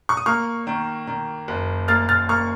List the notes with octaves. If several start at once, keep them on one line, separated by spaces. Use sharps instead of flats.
C#6
D#6
A#3 C#6 F6
D#3
D#3
F#1
A#3 F6 A6
F6 A6
A#3 C#6 F6